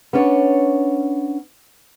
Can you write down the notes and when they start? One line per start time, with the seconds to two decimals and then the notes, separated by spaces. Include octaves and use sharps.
0.13 B3 C#4 D4 C#5